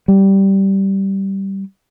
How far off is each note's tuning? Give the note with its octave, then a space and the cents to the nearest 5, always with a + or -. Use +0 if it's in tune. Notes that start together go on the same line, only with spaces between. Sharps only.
G3 -10